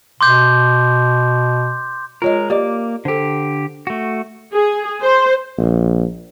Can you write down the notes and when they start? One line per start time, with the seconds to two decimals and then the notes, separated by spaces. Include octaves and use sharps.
0.21 B2 C6 D6 G6
2.22 G#3 F4 A#4 C#5 D#5
2.50 A#3 G4 D5 D#5 D6
3.05 D3 G4 A4 C5
3.87 A3 F#4
4.52 G#4
5.02 C5
5.58 A#1